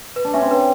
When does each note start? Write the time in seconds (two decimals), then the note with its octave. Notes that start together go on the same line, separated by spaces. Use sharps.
0.16 B4
0.25 D4
0.34 C#4 E5
0.42 C4
0.51 B4